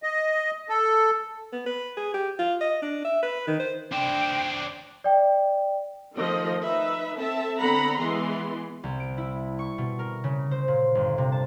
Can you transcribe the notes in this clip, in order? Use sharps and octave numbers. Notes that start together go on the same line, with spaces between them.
D#5
A4
B3
B4
G#4
G4
F4
D#5
D4
E5
B4
D#3
C5
D4 C5 G5
D5 G5
D#3 F3 A3 D#5
D#4 B4 E5
C4 A4 E5 A5
D3 B3 C4 F#5 A#5 B5
E3 G#3 B3 B4 C6
C2
D7
E4
C#6
B2
A#4
C#3
C5
A#2
G1
C3
A5